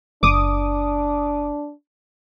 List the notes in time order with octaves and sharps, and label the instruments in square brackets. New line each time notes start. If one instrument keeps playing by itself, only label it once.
[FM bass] F#1 [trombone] D4 [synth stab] D6 D#6